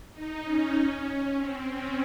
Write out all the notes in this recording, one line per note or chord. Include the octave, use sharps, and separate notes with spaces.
D#4
C#4
C4
C#4